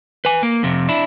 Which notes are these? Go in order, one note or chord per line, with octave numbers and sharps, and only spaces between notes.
B4 G#5
A#3
F2 C3
D4 E4